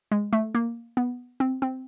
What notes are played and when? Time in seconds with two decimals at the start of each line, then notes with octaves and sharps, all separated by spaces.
0.12 G#3
0.33 A3
0.55 A#3
0.97 B3
1.40 C4
1.62 C4